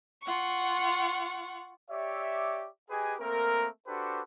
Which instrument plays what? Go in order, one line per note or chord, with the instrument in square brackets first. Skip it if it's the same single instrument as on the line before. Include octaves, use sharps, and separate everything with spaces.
[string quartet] F4 F#5 C#6
[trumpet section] G4 C#5 D5 E5
G4 G#4 B4 D#5 G#5
A3 A#3 C4 A#4
D4 F#4 G4 A4 B4 C5